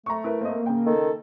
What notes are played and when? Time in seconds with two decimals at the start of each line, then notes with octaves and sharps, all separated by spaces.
0.06 A3 A#5 C#6
0.24 E4 A#4 B4
0.41 A#3 C4 C5 D#5
0.66 C#3 G5
0.86 D#3 A4